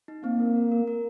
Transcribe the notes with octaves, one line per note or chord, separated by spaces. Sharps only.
D#4
A#3 C4
A#4
A#4
A#4
A#4